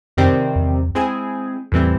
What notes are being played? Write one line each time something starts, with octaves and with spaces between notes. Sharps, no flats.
F2 C3 D#3 G3 C4
E2
G#3 C4 E4 G#4
E2 A2 E3 G3 C4 E4